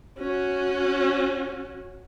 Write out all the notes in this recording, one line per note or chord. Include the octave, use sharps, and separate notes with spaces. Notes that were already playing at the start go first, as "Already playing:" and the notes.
C#4 F#4